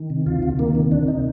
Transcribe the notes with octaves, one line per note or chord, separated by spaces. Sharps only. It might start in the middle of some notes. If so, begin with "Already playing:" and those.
Already playing: D#3
C3
D2 F4
D2
D#3 A#3
C3
D2 D4
D#4